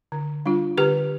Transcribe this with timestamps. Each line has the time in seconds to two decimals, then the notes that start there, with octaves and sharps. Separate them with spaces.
0.12 D3
0.46 G3 D4 F4
0.78 D3 G4 B4